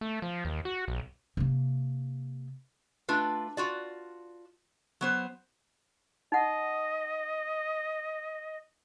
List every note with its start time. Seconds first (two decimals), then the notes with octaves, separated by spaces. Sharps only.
0.01 A3
0.22 F3
0.45 D#2
0.65 F#4
0.88 B1
1.37 C3 A#3
3.09 A3 D4 F4 B4
3.57 F4 F#4 D5
5.01 F#3 B3 C5
6.32 D#4 D#5 F#5